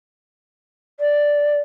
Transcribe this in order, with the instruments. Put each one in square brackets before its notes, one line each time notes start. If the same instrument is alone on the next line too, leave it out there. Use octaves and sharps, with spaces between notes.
[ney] D5